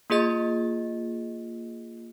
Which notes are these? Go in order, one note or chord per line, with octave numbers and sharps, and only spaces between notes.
A#3 F4 G#4 D#5 A6